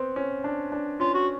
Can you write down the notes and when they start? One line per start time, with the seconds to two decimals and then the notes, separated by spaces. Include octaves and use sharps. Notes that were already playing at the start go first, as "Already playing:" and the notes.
Already playing: B3 C4
0.16 C#4
0.44 D4
0.72 D4
1.00 C#4 F4
1.14 F#4